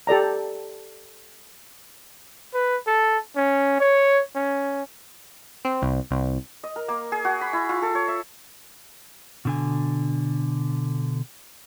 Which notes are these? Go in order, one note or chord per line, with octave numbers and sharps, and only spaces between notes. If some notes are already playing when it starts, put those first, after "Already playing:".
G4 A4 D5 A#5
B4
A4
C#4
C#5
C#4
C4
C2
C2
D#5
A#4
A#3
G#4
F#4
B5
E4
F4
A4
C#5
E5
B2 D3 G#5